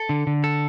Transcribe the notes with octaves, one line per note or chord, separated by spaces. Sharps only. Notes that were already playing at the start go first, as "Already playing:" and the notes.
Already playing: A4
D3
D3
A4